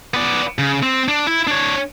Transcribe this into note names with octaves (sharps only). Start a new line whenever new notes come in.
B3 D5
C#3
C4
D4
E4
D4 C#5